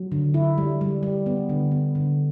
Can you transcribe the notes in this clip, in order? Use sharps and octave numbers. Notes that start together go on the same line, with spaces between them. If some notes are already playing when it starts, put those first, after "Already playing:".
Already playing: F#3
D3
E4
G3
G3
G3
B3
D3
B3
D3